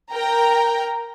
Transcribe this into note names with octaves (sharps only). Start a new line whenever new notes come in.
A#4 G5 A#5